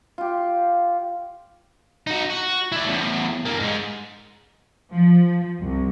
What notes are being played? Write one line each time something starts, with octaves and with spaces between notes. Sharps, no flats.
F4 G4
D#4 F#4
F#4
E4 D5
E2 A2
G2 A#3
G#2 G#3
F3
C2